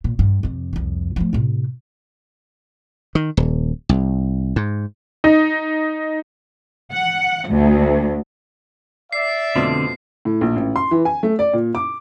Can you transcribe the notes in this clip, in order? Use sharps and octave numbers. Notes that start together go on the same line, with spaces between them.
A#2
G2
F2 C3
C2 F2
F3 A3
A2 C3
D#3
D#1
C2
G#2
D#4
F#5
D2
D5 E5 C7
F2 B2 D3 A3 C4
A2
A#1
A1
C6
E3
G#5
A3
D5
A#2
D6